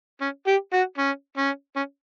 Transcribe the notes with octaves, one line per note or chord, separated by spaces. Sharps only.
C#4
G4
F#4
C#4
C#4
C#4